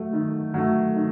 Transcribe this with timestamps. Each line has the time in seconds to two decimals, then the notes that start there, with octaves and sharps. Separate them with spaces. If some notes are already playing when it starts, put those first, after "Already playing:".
Already playing: F#3 A3
0.13 D#3
0.54 F#3 A3
0.96 D#3